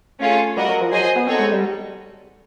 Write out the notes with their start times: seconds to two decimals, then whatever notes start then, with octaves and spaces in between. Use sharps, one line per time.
0.21 A3 C#4 F4 G#4 C#5
0.56 G3 F#4 A#4 D#5 F#5
0.68 F#3
0.81 F3
0.92 F#3 G#4 C5 D#5 G#5
1.16 B3
1.27 C4 D#4 F#4 A4 C#5
1.39 G#3
1.52 G3